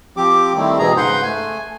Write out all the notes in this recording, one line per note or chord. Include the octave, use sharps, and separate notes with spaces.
F3 C4 G4 D6
D#3 G3 A3 C4 E4
G#2 B2 E3 G#4 A#5
G#2 C#3 B4 F#5 C6 G6
A3 G#5